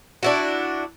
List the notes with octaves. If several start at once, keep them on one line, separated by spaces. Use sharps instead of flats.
D4 E4 F#4